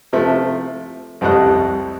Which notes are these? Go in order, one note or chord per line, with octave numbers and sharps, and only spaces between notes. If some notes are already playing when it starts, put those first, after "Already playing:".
C3 F3 A3
C2 F2 G3 A3 D#5 F#6